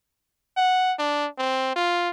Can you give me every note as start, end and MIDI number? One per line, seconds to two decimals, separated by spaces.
0.57 0.94 78
0.99 1.27 62
1.38 1.75 60
1.76 2.10 65